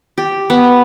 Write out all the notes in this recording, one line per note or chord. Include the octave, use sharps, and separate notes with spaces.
G4
B3